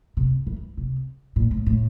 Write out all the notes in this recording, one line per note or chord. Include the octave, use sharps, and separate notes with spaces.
C3
E3
C3
A#2
A2
A2